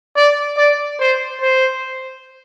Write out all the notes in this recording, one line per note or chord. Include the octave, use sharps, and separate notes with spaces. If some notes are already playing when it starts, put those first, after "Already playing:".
D5
D5
C5
C5